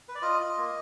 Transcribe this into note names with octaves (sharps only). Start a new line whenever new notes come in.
B4
D5
F4 D#5
F4
A#3